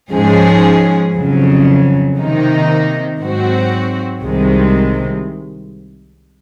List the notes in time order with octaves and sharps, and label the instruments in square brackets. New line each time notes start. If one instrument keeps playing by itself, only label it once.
[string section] G#2 F3 G#3 C#4 G#4
F2 C#3 F#3
C3 D#3 A#3 D#4
G#2 F#3 C4 F#4
C2 C3 D#3 G#3